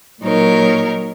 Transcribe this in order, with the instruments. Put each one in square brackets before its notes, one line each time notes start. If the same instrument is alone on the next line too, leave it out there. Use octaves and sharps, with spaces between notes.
[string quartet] A#2 F#3 D#4 A#4 C#5